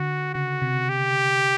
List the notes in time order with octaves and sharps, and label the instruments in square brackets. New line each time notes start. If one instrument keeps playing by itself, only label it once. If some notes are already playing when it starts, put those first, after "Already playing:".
Already playing: [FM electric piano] D3 [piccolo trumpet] F#4
[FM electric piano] C#3 [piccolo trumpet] F#4
[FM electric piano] C3
[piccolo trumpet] G4